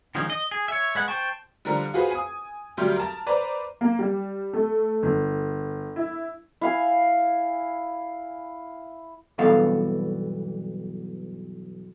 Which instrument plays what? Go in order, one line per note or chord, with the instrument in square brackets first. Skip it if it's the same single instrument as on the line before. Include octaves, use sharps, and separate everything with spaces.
[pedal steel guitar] D#3 F3 G#3 C#4 D#4
D#5
G#4
C#5 E5
G#3 B4 F#5
C5 G5 A5 C#6
[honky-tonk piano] D3 F3 G3 A#4
F4 F#4 G#4 B4 C5
G#5 D#6
D2 F#3 G3 G4 C6 F6
A#4 A5
B4 C5 D5 A#5
A#3
G3
A3
G1
E4
[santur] E4 F5 G#5
[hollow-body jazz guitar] B1 G2 E3 B3 A4 F5